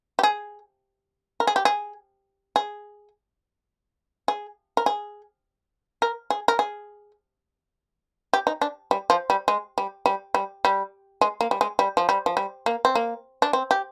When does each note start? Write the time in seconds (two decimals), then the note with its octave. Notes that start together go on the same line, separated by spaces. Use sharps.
0.19 G4
0.23 G#4
1.40 A#4
1.47 G#4
1.56 G4
1.65 G#4
2.56 G#4
4.28 G#4
4.77 A#4
4.86 G#4
6.02 A#4
6.30 G#4
6.48 A#4
6.59 G#4
8.33 G4
8.47 D#4
8.61 D4
8.91 G3
9.10 F3
9.30 G3
9.48 G#3
9.78 G3
10.06 G3
10.34 G3
10.65 G3
11.21 G#3
11.41 A#3
11.51 G3
11.61 G#3
11.79 G3
11.97 F3
12.09 G3
12.26 F3
12.37 G3
12.66 A#3
12.85 C4
12.95 A#3
13.42 D4
13.53 C4
13.71 G4